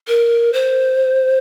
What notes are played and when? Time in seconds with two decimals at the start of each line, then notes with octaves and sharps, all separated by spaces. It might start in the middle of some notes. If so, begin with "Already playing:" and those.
0.08 A#4
0.53 C5